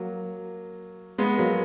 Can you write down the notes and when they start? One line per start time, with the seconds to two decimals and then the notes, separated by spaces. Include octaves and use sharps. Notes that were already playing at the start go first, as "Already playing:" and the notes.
Already playing: F#3 A#3
1.18 G#3 B3
1.38 F#3 A#3